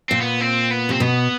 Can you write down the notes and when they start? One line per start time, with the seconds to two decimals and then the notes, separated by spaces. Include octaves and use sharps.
0.09 A#2 C4
0.21 B3
0.41 C4
0.71 B3
0.89 C3 C4
1.00 B2 B3